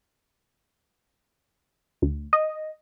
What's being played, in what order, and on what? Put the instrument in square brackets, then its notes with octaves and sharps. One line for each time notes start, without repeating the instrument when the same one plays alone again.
[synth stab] D2
D#5